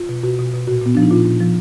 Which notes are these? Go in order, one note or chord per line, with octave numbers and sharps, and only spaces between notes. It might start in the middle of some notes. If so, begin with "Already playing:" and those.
Already playing: F4
B2
B2 F#4
B2
B2
A#2 F#4
A#2 B3
F3 D4
D#4
A#2 F4
A#2
F3